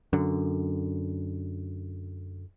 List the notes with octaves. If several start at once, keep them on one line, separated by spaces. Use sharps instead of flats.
F#2 D3